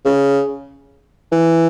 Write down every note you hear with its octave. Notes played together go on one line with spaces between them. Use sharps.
C#3
E3